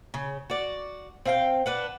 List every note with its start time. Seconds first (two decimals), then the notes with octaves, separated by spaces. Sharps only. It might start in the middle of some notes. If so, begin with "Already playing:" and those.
0.14 C#3
0.50 F#4 D5
1.25 C4 F5 G5
1.66 D4 B4 F#5